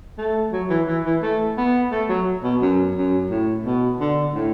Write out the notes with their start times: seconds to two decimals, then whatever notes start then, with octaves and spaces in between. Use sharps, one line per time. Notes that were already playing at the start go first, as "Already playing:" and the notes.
0.18 A3
0.52 F#3
0.70 E3
0.87 E3
1.04 E3
1.23 A3
1.57 B3
1.91 A3
2.09 F#3
2.43 B2
2.61 F#2
2.96 F#2
3.30 A2
3.65 B2
4.00 D3
4.34 A2